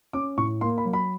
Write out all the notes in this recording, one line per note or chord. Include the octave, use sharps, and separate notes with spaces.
C#4 D6
A2 C#6
A#3 C6
B5
F#3
B5